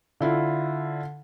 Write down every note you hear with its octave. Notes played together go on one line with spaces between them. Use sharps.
D3 E4 F4